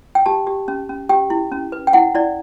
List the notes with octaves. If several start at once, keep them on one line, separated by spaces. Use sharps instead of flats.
G5
G4 A5
G4
C#4
C#4
G4 G5
E4
C#4
B4
G5
E4 F#5
E4 D5